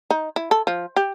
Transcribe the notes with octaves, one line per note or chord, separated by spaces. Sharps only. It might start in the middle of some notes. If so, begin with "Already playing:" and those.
D#4
E4
A4
F3
G4